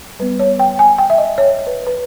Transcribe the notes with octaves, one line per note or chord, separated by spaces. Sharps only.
G3 B3 B4
C#5
G5
G#5
G5
E5
D#5
C#5
B4
B4